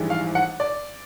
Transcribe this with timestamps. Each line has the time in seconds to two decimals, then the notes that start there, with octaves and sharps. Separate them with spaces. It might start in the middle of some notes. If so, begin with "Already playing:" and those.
Already playing: A#1 G#2 E3 G3
0.10 F5
0.35 F#5
0.60 D5